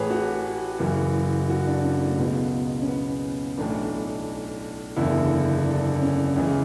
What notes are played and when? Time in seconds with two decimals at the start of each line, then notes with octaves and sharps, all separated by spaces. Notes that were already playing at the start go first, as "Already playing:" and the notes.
Already playing: A1 A2 E3 G#4 B4 C#5
0.10 F#4
0.80 F#1 F#2 E3
1.49 F#4
1.67 D4
1.84 C#4
2.02 A3
2.19 C#2 B2 B3
2.82 C#4
2.88 B3
3.57 B1 A2 E3 D4
4.97 F#1 E2 D3 E4
5.66 D4
6.02 C#4
6.36 C#2 C#3 E3 C#4